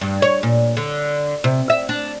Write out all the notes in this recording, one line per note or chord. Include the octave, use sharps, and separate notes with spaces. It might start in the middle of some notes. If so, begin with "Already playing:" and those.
G2
C#5
A#2
D3
C3
E5
D4